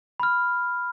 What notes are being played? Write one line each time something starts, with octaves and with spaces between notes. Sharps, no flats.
B5 F6